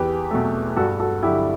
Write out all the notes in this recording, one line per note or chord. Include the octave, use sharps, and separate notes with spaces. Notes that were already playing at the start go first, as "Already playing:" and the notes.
Already playing: E2 G4 B4
B2 F#3 A3
G2 F#4 A4
F#4 A4
D3 F#3 E4 G4